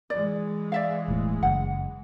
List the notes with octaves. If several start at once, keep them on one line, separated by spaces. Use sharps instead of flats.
E3 G#3 D5
D5 E5 F5
E1 A2
F#1 F#5